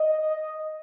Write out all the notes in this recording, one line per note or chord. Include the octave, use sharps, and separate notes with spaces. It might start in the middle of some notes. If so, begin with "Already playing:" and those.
Already playing: D#5